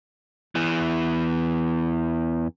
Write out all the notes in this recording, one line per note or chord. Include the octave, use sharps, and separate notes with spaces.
E2 E3